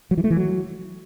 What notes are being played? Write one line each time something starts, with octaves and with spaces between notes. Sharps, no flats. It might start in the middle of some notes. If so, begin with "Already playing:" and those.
F#3
E3
A3
E3
F#3